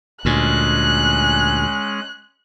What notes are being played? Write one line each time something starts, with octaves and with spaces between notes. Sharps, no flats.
D2 A#2 G#3 C#4 F#6